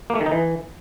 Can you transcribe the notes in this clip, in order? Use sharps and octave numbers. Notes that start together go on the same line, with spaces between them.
A#3
A3
D#3
D#4
E3